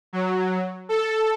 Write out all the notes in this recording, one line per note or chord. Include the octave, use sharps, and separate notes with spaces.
F#3
A4